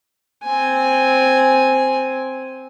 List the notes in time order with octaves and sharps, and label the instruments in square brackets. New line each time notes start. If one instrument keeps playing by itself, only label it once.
[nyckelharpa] C4 G#5